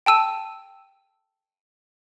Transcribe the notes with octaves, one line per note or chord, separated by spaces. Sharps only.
G5 A5 E6 D#7